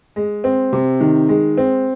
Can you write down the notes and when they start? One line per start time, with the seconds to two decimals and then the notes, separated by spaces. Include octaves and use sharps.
0.16 G#3
0.44 C4
0.73 C3
1.01 D#3
1.29 G#3
1.57 C4